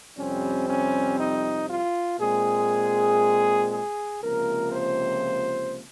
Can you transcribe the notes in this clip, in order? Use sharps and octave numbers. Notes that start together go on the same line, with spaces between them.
F2 C3 G3 C4 C#4
C#4
D#4
F4
A#2 G#3 C4 G#4
G#4
C#2 C3 F3 A#3 A#4
C5